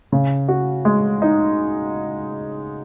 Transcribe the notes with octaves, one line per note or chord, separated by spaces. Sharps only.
C#3
F#4
G#3
D#4